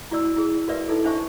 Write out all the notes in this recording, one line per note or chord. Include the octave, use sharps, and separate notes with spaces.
E4 F#4 D5 E6
E4 G#4
F#4 A#4 B4 D5 E5
D#4 E4 A4
D4 C5 E5 A5 C#6